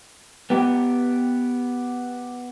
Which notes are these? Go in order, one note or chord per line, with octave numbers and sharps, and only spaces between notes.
B3 G4